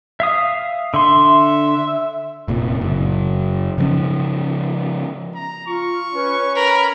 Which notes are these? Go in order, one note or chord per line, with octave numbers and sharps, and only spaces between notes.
E5 F5 D#6
D3 E5 C6
F1 A#2
F#1
C#3 F3 C#4
A#5
F4 C#6
C#4 B4
A#4 B5